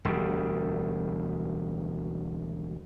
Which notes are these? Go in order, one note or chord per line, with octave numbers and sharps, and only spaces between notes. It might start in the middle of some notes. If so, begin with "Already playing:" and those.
E1 D2 G3